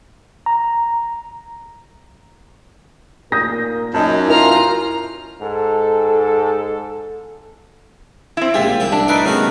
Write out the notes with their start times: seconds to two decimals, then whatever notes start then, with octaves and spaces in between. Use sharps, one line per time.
0.46 A#5
3.32 A#2 A#4 D#6 G6 A#6
3.94 F#2 D#4 D#5 A5
4.28 E4 F4 A#4 A#5 F6
5.41 G#2 A4
8.37 C4 E4
8.54 A#1 G#3 F4 G4
8.80 C2 E4
8.92 D4
9.08 A2 A3 D#4 B4 E5 C6 D6
9.25 C#3 G3 A3 B3 F#4 A#4